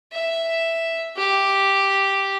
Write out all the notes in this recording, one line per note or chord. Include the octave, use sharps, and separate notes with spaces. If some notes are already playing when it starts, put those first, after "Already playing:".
E5
G4